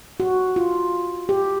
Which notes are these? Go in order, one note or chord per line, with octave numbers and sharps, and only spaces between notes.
F#4
F4
G4